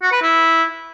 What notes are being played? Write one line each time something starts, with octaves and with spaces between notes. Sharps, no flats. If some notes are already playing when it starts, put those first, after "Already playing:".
F#4
B4
E4